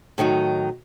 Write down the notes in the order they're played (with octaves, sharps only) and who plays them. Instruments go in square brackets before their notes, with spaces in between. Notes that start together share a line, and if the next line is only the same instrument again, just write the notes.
[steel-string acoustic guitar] A2 D#3 F#3 D#4